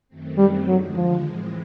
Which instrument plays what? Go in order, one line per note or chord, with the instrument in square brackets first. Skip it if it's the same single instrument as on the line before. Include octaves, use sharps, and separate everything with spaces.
[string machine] F#2 D#3 F#3 A3 C4
[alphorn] G3
[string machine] D#2 D3 F3 G#3 [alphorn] F#3
[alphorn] F3
[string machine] A2 E3 G#3 C4